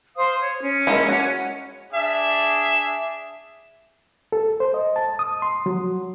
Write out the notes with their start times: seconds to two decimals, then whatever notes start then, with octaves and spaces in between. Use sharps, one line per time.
0.16 C5 F5 D#6
0.41 C#5
0.62 C#4
0.87 G#3 A#3 E4
1.09 F#4 C#5
1.93 D4 G#4 E5
4.32 A4
4.60 C5
4.74 D#5
4.96 A5
5.19 D#6
5.42 C6
5.66 F#3